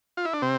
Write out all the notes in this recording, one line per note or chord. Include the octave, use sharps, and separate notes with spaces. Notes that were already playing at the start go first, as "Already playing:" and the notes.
F4
E4
D4
C3 C4